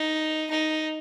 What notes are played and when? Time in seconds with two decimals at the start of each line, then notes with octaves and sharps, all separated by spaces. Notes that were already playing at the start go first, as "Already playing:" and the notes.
Already playing: D#4
0.50 D#4